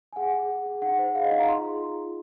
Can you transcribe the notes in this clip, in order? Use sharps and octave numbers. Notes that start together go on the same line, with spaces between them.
G#5
G#4 F#5
G#4
G#4
G#4
D#4 F#5
C5
G#4 F5
D#5
D#4 F5
A#5
F4 C6
G#4
F4
F4